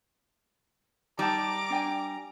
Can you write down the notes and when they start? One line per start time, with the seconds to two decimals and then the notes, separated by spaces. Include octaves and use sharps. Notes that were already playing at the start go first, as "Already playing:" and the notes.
1.19 G3 D#4 A5 A#5 D6
1.70 D4 G5 G#5